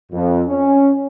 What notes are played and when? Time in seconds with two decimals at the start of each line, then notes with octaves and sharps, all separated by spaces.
0.12 F2
0.49 C#4